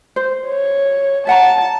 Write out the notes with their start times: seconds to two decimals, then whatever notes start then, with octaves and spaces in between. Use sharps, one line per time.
0.16 C5
0.47 C#5
1.27 E5 F#5 A5 A#5